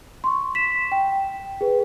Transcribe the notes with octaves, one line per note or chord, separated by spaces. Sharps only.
C6 C#6
B6 E7
G5
G#4 B4